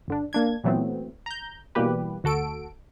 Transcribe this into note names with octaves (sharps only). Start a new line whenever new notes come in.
G1 D3 D4
A#3 D4 G#6
A#2 E3 F#3 A3 B3 C4
A#5 G6
B2 E3 G3 A#3 G4 B4
D2 F#4 A4 D7